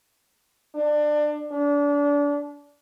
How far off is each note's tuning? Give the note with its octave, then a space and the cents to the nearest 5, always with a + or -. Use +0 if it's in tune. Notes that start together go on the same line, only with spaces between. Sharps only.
D4 +25
D4 -30